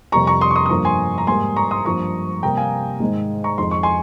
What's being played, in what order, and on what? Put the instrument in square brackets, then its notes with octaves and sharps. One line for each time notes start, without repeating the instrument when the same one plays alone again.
[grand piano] F2 C3 G3 A#3 A#5 C#6
A#5 C#6
C6 D#6
C#6
C6 D#6
D#6
G2 F3 A#3 A#5 C#6
G#5 C6
A#5
G#2 G3 A#3 G#5 C6
A#5 C#6
C6 D#6
G2 F3 A#3 A#5 C#6
C3 G3 A#3 G5 A#5
F5 G#5
G#2 D#3 G#3
A#5 C#6
F2 D#3 G#3 C6
C#6
G#5 C6